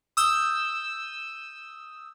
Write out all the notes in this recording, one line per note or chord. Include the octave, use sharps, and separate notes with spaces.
D#6 E6 G6